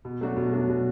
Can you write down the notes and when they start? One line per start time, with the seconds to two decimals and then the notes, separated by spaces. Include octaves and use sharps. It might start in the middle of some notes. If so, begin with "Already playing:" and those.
0.05 B2
0.21 F#3 A3 D4 F#4
0.36 B2
0.53 F#3 A3 D4 F#4
0.69 B2